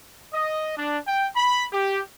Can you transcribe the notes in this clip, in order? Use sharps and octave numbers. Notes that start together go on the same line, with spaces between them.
D#5
D4
G5
B5
G4